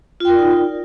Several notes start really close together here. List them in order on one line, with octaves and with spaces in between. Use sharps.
F4 G5 A#4 D5 D#4